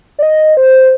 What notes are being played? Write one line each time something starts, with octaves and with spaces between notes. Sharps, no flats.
D5
D#5
C5